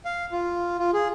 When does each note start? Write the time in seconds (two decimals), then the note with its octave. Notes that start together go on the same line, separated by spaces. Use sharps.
0.05 F5
0.32 F4
0.79 F4
0.93 G#4